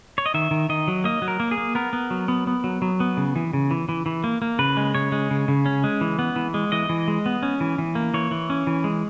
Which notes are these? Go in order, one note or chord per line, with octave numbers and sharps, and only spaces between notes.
C#5
D#5
D#3 E5
D#3
D#3 D#5
F#3
A#3 D#5
F#3
A#4
A#3
G#4
A#3
B3 A#4
B3
F#3
B3
B3
F#3
F#3
B3
C#3
E3
C#3
E3
E3
E3
A#3
A#3
C#3 B4
G#3
C#3 C#5
G#3
C#3
C#3
C#4
G#3
E3
B3
E3
G#3
E3 D#5
E3
G#3
B3
C#4
E3
E3
A#3
E3 C#5
E3
C#4
E3
G#3